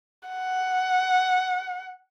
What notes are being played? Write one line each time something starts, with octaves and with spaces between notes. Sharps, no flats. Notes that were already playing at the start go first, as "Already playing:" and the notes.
F#5